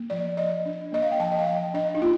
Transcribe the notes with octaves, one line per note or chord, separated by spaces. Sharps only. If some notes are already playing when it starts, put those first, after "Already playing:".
Already playing: A#3
F3 D5
F3 D#5
D4
A#3 D#5
F5
G5
F3 A5
D#5
F5
F3 G5
D4 D#5
D#4
A#3 F4